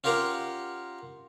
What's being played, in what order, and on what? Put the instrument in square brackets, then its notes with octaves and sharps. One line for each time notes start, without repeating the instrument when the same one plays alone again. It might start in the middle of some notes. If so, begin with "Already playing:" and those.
[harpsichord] C#4 F4 G4 A#4 F5 F#5